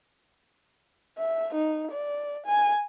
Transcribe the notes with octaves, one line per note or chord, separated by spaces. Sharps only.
E5
D#4
D5
G#5